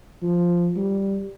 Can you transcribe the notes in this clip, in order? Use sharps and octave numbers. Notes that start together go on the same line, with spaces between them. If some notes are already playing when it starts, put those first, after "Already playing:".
F3
G3